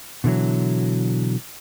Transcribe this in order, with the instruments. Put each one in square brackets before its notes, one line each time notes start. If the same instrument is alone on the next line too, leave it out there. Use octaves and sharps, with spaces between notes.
[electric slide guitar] B2 D3 E3 F#3